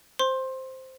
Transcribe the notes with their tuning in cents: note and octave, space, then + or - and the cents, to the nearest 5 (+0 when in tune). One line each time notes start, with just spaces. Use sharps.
C5 +0 C6 +20